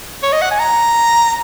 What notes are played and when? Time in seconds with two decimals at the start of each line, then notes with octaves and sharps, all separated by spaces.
0.23 C#5
0.32 D#5
0.42 F#5
0.51 G#5
0.60 A#5